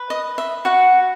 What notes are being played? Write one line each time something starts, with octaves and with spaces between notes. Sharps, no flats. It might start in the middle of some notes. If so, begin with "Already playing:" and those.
Already playing: B4
D#5
E5
F#4 F#5